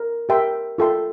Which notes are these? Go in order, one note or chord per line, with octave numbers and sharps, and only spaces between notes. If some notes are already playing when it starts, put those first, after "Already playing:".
Already playing: A#4
G4 A#4 E5 G5 C6
F4 A4 E5 G5 C6